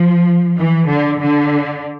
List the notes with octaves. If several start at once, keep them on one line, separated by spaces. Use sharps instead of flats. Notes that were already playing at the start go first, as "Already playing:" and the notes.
Already playing: F3
E3
D3
D3